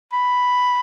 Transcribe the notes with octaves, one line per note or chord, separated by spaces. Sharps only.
B5